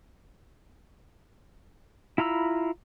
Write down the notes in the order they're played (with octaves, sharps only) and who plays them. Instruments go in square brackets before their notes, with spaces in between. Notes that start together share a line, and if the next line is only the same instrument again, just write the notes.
[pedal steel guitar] E4 F4 A#5 B5 E6